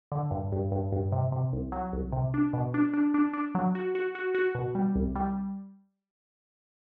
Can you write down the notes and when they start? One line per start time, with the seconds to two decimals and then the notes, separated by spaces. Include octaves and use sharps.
0.12 D3
0.31 G2
0.52 G2
0.72 G2
0.92 G2
1.12 C3
1.32 C3
1.53 C2
1.72 F#3
1.93 C2
2.12 C3
2.34 D4
2.53 B2
2.74 D4
2.93 D4
3.14 D4
3.34 D4
3.55 F#3
3.75 F#4
3.95 F#4
4.15 F#4
4.35 F#4
4.55 B2
4.75 G3
4.95 C2
5.15 G3